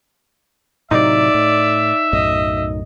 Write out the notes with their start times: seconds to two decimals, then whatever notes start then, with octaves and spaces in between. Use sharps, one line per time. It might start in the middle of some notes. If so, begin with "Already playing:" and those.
0.91 A2 C3 F#3 D#4 D5 E5
1.34 A2
2.13 B1 F#2 A2 D#5